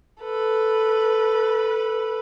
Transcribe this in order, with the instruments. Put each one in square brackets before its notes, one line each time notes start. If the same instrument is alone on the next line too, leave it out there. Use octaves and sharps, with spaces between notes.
[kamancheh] A4 B4